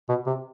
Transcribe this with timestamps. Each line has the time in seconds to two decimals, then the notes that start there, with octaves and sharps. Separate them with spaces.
0.09 B2
0.27 C3